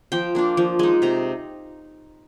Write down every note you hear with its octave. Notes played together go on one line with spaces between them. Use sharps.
F3 G5
A#3 D4 F4
F3
G#3 D#4
C3 A#5